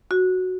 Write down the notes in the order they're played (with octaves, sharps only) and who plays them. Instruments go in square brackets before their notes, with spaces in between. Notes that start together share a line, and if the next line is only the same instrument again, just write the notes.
[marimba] F#4